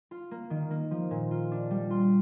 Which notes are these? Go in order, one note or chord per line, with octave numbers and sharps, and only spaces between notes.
F4
A#3
D#3
A#3
F3
A#2
F4
D4
G3
F4 C6